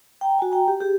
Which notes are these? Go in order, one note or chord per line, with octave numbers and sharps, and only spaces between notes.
G5 A#5
F#4 G#5
G5 A#5
G4
G4 G#4